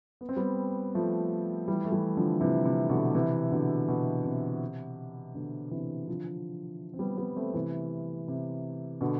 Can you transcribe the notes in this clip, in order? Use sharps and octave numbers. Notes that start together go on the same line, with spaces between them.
B3
C4
G3 B3
F3 A3
E3 G3
A3
E3 G3
D3 F3
C3 E3
C3
B2 D3
C3 E3
B2 D3
B2
C3
B2 D3
C3 E3
D3 F3
C4
G3 B3
G3 B3
A3 C4
C3 E3
C3
B2 D3